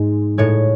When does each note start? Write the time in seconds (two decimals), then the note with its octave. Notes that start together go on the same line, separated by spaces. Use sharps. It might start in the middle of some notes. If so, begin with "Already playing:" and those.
Already playing: G#2 G#3
0.38 A2 G#3 C#5